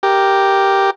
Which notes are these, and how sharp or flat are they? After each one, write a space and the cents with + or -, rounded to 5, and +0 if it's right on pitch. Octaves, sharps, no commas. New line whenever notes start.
G4 +0 A#4 +0